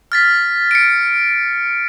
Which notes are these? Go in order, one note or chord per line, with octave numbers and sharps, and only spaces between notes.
F6 A6 B6
C#7 D7